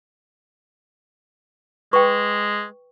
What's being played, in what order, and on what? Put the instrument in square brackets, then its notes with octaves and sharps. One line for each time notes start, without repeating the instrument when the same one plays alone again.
[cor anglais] G#3 [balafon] B4 [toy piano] G5 C#6